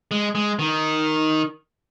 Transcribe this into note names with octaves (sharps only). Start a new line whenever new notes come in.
G#3
G#3
D#3